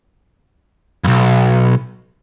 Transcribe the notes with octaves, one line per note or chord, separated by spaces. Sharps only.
B1 F2